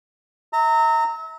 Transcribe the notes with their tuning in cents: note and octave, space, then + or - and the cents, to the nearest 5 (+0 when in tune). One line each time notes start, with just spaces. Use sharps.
E5 -35 A#5 -25